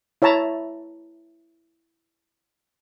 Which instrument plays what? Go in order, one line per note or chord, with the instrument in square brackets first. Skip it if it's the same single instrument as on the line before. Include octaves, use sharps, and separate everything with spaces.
[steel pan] E4 C#5 E5 A5 A#5